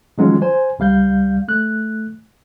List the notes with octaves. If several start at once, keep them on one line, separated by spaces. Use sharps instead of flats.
D#3 F3 F#3 G#3 C#4 F4
C5 G#5
C#2 G3 F5 G6
A3 F#6